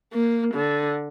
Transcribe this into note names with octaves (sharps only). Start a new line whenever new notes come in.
A#3
D3